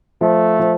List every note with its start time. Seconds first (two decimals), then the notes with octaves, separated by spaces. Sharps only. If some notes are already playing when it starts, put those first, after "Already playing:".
0.21 F3 A3
0.60 F3